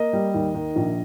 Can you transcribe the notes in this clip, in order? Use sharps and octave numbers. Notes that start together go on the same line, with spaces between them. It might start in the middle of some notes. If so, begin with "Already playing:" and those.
Already playing: A#3 D#5
G3
D#2
D#3
A#1